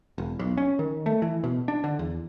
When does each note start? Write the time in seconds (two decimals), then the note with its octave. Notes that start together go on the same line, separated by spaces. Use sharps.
0.18 E1
0.39 B1
0.57 C#4
0.79 D#3
1.06 A3
1.22 E3
1.44 B2
1.68 D4
1.84 D3
1.99 E2